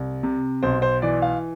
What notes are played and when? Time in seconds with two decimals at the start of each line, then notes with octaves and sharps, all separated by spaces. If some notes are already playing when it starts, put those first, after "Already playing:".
Already playing: C2
0.23 C3
0.63 B1 C5
0.82 C5
1.02 E3 D5
1.22 F5